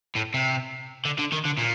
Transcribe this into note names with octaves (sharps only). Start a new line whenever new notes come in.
A2
C3
D3
D3
D#3
D3
A#2